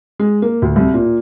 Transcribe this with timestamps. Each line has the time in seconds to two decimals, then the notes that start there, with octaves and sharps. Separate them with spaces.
0.19 G#3
0.42 A#3
0.62 D2
0.76 C2
0.94 A#2